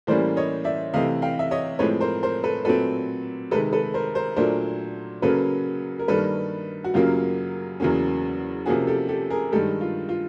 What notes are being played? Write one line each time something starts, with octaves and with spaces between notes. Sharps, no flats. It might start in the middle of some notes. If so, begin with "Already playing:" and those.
A2 E3 G3 A#3 C#4 C5 D5
C#5 D#5
D5 E5
C3 E3 A3 C4 D#5 F5
F5 G5
E5
C#5 D#5
A2 F3 G#3 C4 B4 C#5
A#4 C5
A#4 C5
A4 B4
A#2 F#3 A3 C4 A4 B4
C3 D#3 G#3 A4 B4
A4 B4
A#4 C5
A#4 C5
A#2 F#3 A3 D4 A#4 C5
C#3 F#3 A#3 C#4 A4 B4
A#4
G2 D#3 G3 A#3 A4 B4
F#4
F#2 C#3 F#3 A#3 F4 G4
E2 C#3 F#3 A#3 C#4
C3 F3 A#3 C#4 F#4 G#4
G4 A4
G4 A4
G#4 A#4
G2 D#3 G#3 G4 A4
F4
F4